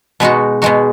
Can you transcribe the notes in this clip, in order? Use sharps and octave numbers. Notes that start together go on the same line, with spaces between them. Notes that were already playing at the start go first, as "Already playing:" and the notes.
B2 G#3 D#4 F#4
B2 G#3 D#4 F#4